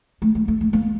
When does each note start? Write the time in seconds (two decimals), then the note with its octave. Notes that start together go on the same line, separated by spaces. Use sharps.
0.22 A3
0.35 A3
0.48 A3
0.61 A3
0.73 A#3